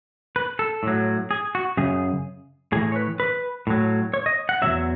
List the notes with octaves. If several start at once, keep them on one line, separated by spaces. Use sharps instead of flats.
B4
A4
A2 F#3
G#4
F#4
F#2 C#3 G#4
A2 E3 G#4
C#5
B4
B4
A2 F#3
C#5
D#5
F#5
E2 B2 F#3 E5